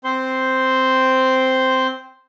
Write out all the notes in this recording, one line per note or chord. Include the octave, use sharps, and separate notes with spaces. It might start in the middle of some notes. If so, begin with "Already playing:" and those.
C4 C5 C6